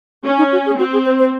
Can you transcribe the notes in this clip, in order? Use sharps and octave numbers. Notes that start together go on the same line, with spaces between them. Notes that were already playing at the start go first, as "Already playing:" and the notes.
C#4
D#4
F#4
G#4
C4 F#4
G#4
C5
C5